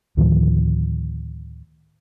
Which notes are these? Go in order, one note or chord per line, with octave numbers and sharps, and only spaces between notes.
D2 A2 D#3 F3